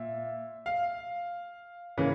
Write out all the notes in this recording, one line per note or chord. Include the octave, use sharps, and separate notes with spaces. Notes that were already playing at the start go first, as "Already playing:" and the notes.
Already playing: A#2 E5
F5
C#3 E3 A#3 C#4